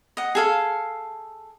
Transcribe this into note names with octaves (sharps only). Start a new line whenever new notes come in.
D#5 F#5
G#4 A4 F5